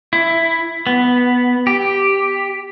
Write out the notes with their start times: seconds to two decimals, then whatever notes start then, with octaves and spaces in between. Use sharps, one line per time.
0.13 E4
0.87 B3
1.67 G4